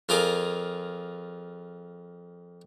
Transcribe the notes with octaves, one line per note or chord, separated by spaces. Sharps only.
F2 F4 G#4 A#4 D6